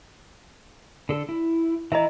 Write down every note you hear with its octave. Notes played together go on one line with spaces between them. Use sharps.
D3 A4
E4
E3 E4 D#5 E5 A#5